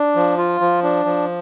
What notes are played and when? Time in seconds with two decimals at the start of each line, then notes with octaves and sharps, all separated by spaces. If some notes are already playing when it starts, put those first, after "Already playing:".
Already playing: D4
0.15 F3
0.38 F4
0.61 F3
0.83 D4
1.05 F3